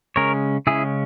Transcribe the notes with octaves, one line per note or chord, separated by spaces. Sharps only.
C#3 G#3 C#4 A#4 C#5
C#3 G#3 C#4 E4 G#4